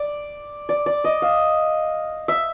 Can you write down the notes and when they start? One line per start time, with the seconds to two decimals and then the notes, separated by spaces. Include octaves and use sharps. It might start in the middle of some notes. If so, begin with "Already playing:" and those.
Already playing: D5
0.69 D5
0.86 D5
1.04 D#5
1.22 F5
2.28 E5